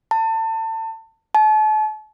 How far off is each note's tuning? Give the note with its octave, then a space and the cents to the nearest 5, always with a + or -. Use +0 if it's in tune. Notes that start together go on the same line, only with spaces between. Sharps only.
A5 +30
A5 -40